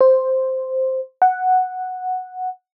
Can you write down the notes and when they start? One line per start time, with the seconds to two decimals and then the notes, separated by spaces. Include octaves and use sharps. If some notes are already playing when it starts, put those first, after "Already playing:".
0.01 C5
1.22 F#5